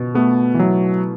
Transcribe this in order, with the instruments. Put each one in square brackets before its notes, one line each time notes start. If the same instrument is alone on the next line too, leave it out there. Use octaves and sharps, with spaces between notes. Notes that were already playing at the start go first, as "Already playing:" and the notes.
Already playing: [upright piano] B2
[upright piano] A3 [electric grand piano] B3
[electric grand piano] E3
[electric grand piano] F#3 [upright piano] E4